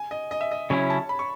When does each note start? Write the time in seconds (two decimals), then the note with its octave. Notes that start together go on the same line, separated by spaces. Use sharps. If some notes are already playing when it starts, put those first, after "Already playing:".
Already playing: G#5
0.11 D#5
0.31 D#5
0.41 E5
0.52 D#5
0.70 C#3 F#3 C#4 E4 C#5
0.90 A5
1.09 B5
1.19 C#6